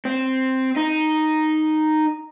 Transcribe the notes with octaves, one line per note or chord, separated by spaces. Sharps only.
C4
D#4